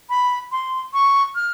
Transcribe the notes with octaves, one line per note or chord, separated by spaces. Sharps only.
B5
C6
C#6
F6